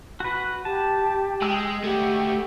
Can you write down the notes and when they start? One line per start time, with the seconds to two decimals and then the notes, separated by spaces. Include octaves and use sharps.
0.20 F#4 B4
0.65 G4 A5
1.42 G#3 G5 E6
1.84 A3 F#4 G4